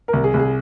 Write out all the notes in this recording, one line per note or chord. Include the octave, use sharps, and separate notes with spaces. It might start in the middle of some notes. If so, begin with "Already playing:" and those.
A#4
C2
G#4
C2
G#4